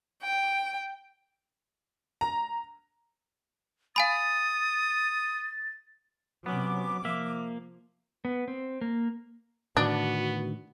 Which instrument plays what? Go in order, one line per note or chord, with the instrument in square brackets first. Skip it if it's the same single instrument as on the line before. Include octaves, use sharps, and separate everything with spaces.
[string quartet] G5
[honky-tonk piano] A#5
[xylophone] F5 G#5 B5 [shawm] D#6 [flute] A6
[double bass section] C3 F#3 [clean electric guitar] B3 C#4 [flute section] D6
[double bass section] F3 [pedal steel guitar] A#3 [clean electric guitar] E5
[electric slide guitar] B3
C4
A#3
[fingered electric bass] A2 D3 D#3 [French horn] B3 [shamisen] D4 [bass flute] F#4